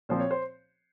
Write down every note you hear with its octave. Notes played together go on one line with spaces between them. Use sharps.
A#2 F3 C4 C5
C#5
C5